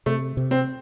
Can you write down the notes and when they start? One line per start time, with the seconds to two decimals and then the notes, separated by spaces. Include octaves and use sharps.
0.06 C3 A3
0.37 C3
0.51 C4